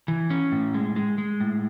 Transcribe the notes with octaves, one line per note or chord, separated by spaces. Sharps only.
E3
C#4
A2
G#3
G#3
G#3
A2